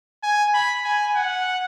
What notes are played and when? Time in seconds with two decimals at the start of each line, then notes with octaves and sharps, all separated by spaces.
0.23 G#5
0.54 B5
0.85 G#5
1.15 F#5